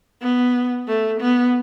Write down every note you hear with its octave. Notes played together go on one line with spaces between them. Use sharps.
B3
A3
B3